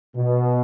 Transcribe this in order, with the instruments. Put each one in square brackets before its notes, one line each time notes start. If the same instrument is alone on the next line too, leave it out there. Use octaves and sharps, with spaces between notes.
[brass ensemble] B2